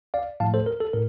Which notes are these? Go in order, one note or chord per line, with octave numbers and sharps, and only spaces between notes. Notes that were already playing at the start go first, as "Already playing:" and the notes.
D5 F5
A2 F3 A3 F5 A5
A4 C5
A#4
A4
A2 A#4